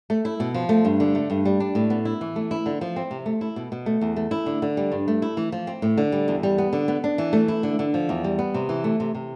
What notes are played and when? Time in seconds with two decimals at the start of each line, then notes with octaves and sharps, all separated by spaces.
0.10 A3
0.25 E4
0.40 B2
0.54 F3
0.69 A3
0.85 G2
1.00 D3
1.15 A3
1.30 G2
1.45 G3
1.60 D4
1.75 A2
1.90 B3
2.05 E4
2.21 E3
2.36 A3
2.51 E4
2.66 D3
2.81 F3
2.96 C4
3.11 C3
3.26 A3
3.41 E4
3.56 B2
3.72 B2
3.86 A3
4.01 E2
4.16 A3
4.31 E4
4.46 D3
4.62 D3
4.77 G3
4.92 G2
5.08 A3
5.22 E4
5.37 E3
5.52 F3
5.67 C4
5.82 A2
5.97 D3
6.12 G3
6.28 E2
6.43 G3
6.58 B3
6.73 D3
6.88 B3
7.04 D4
7.18 E3
7.33 A3
7.48 E4
7.63 D3
7.79 D3
7.94 F3
8.09 E2
8.24 G3
8.39 B3
8.54 C3
8.69 E3
8.84 A3
9.00 C3
9.15 C3